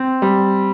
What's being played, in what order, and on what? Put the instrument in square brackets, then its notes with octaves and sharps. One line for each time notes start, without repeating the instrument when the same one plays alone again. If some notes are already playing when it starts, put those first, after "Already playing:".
Already playing: [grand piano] C4
G3